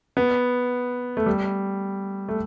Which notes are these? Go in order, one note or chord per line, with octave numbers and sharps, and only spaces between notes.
B3
A3
G3
A3